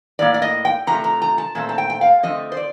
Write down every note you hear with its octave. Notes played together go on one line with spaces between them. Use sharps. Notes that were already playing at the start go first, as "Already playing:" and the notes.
A2 G3 A#3 D5
D5
D#5
G5
C3 F3 A3 A#5
A#5
A#5
A5
A#2 A3 C4 A5
A5
G5
G5
F5
D3 F3 A3 C4 D#5
C5
D5